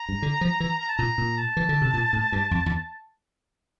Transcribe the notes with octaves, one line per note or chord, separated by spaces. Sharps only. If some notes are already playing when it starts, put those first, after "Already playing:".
Already playing: A#5
G2
D3
F3
E3
A#5
A5
A#2 A#5
A#2
A5
E3
D3
C3
A#2
A2
G2
F2
E2